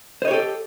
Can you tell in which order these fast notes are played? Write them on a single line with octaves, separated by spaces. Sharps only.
C5 D#5 C#5 G4 A4